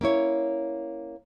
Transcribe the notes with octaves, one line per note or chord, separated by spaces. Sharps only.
A#3 C#4 E4 C#5